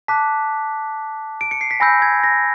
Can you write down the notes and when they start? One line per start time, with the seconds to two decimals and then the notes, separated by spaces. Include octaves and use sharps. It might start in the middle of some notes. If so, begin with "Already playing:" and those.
0.08 A5 D6 F#6 B6
1.41 D7
1.51 C#7
1.61 C7
1.71 B6
1.80 G#5 B5 E6 G6 A#6
2.02 G#6
2.23 A#6